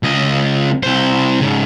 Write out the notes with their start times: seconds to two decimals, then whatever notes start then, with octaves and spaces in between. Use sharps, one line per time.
0.03 C#2 D#5
0.83 C2 C5
1.41 G#2 C#3